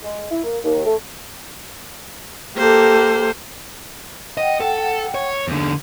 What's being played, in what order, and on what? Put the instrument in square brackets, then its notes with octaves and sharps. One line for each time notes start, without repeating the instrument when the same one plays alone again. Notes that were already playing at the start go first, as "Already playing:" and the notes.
[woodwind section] G#3
E4
A#3
D#2
A3
[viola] A#3 C5 [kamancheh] G4 A4
[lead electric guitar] D#5 [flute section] F#5 G5
[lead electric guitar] A4
C#5
E2 D3